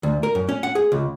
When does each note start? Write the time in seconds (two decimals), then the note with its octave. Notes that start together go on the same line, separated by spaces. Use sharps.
0.03 D2
0.23 A#4
0.35 F#2
0.49 C#4
0.63 F#5
0.75 G#4
0.92 C#2